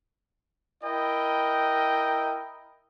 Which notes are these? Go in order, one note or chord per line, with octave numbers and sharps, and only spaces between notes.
E4 A#4 D#5 G5